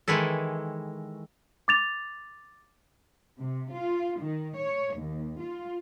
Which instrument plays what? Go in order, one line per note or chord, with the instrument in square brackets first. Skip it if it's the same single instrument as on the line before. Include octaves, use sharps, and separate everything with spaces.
[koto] D#3 E3 G#3 E4 A4
[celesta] D6 A6 F7
[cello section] C3
F4
D#3
C#5
D#2
F4